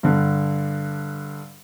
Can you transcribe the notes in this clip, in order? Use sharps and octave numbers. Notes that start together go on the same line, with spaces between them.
G2 D3